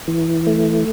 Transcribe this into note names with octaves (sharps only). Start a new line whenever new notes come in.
E3
A3